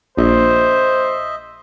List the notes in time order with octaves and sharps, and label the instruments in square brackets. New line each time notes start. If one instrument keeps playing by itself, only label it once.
[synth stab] A#1 [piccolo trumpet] C5 [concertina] D#5 E5